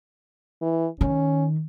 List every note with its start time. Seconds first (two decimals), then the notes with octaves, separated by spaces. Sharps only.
0.62 E3
1.01 D#3 C#4